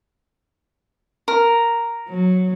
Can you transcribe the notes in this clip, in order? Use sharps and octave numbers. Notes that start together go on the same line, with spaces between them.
A#4
F#3